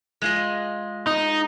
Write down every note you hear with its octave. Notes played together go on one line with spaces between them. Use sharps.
G#3 F4 D#5
D#4